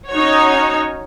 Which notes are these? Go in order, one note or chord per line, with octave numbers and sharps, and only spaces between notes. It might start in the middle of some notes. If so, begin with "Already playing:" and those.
C#4 D#4 F#4 C#5